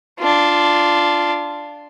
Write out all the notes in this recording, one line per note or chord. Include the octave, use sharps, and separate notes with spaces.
D4 F4